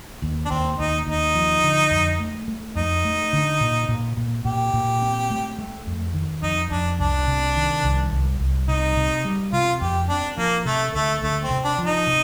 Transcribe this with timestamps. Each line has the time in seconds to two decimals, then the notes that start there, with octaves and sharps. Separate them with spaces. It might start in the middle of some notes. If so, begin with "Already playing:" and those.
0.22 D#2
0.45 D4
0.50 D#2 C4
0.79 D#2 D#4
1.07 D#2 D#4
1.35 F3
1.63 D3
1.91 F2
2.20 A3
2.48 A3
2.75 F2 D#4
3.05 A3
3.33 D3
3.61 A#2
3.89 A#2
4.17 A#2
4.45 A#2 G4
4.74 A#2
5.02 C4
5.30 A3
5.59 A3
5.87 F2
6.14 D#3
6.42 F2 D#4
6.71 F2 D4
6.99 C2 D4
7.27 C3
7.56 D#3
7.83 C2
8.11 C2
8.40 C2
8.68 C3 D#4
8.97 C3
9.25 G3
9.53 C3 F4
9.81 F2 G4
10.09 C4 D4
10.37 F3 A#3
10.65 C3 A3
10.94 D2 A3
11.22 D2 A3
11.44 C4
11.51 C3
11.64 D4
11.79 F3
11.85 D#4
12.07 C3